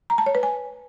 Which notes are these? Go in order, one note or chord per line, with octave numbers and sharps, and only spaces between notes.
A#5
A5
C#5
B4
G#5